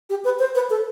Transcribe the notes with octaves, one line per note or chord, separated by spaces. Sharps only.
G4
B4
C5
B4
A4